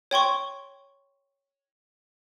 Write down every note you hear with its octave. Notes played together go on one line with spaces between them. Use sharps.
C#5 G5 C6 C#6